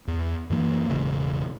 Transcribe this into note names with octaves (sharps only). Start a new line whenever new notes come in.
E2
F#2 E3 A#3
E1 A1 C#3